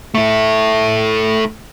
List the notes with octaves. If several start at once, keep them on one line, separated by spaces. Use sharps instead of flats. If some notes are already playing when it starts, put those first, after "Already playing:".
A3 E4